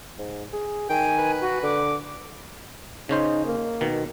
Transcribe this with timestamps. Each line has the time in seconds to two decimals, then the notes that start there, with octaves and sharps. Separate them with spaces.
0.18 G#2
0.53 G#4
0.90 D#3 G5 G#5
1.18 B4
1.41 F#4
1.63 D3 D6
3.09 C#3 C#4 D#4 C5
3.45 A#3
3.81 B2 D#3